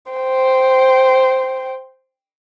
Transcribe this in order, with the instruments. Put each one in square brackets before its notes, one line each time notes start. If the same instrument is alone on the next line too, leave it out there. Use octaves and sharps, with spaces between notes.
[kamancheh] C5 G5